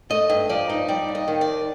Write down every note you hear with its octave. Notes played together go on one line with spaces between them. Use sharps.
A3 D#5
G2
F3 D5
D#4
G3 D5
D#2
D#5
D#3
D5
D#2